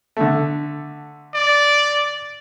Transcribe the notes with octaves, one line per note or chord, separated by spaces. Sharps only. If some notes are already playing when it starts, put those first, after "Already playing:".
D3 A3
D5